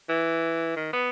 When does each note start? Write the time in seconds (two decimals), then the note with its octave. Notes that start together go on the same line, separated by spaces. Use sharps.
0.09 E3
0.76 D#3
0.93 B3